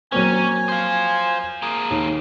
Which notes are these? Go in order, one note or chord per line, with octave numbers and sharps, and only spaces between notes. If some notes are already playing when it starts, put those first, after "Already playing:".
F#3 A#3 C4 C#4 G#5
C5 F5
A#3 G#4
D#2